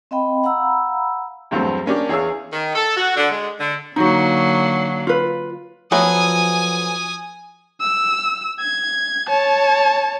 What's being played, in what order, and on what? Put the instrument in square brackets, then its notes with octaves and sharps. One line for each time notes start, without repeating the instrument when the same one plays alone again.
[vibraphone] C4 D#5 F5 G5 B5
F5 F#5 A#5 B5 E6
[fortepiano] E2 G2 F#3 A3 C4
A#3 C#4 D4 G4
E2 G#4 C#5 F5 E6
[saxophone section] D#3
A4
F#4
D3
G#3
D3
[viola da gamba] D3 F#3 A#3 [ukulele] D#4 F#4
[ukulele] F4 B4
[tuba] F3 [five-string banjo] F#3 A3 B3 [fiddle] G#5 D#6
[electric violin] E6
G#6
C#5 A5